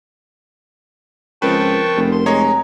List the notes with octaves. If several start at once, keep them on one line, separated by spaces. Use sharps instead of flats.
C#2 F3 C4 A#4 B4 G5 A5 C#6
A#4
F1
C6
G#3 C#5 D#5 A#5